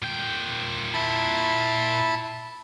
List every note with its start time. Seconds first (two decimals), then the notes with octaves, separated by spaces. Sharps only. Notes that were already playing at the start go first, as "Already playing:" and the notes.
0.02 A#2 G5
0.94 E4 A5 B5